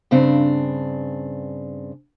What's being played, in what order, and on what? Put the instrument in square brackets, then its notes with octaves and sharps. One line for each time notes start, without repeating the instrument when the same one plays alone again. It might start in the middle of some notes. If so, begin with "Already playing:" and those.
[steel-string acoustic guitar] G2 C#3 C4 D4